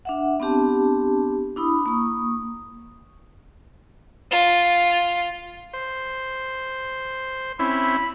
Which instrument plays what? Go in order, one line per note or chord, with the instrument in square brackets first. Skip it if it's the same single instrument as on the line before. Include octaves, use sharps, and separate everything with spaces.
[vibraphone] D4 E5 F#5
B3 C4 D4 G4 A5
D4 E4 B5 D#6
A#3 C#6 D#6
[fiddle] F4
[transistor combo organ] C5
[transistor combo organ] C4 C#4 E4 [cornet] B5